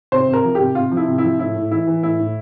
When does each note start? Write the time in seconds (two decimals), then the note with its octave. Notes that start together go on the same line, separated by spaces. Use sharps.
0.12 C3 C5
0.28 C3
0.33 A#4
0.44 F3
0.55 G4
0.60 C3
0.75 C3 F4
0.92 F3
0.97 E4
1.08 C3
1.18 E4
1.24 F3
1.39 A2 E4
1.55 A2
1.71 E3 E4
1.87 E3
2.03 A2 E4
2.19 A2